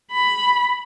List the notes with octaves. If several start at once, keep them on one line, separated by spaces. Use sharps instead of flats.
B5